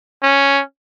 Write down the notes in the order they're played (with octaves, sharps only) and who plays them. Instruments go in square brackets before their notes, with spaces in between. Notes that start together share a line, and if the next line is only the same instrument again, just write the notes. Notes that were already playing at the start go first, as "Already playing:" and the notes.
[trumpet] C#4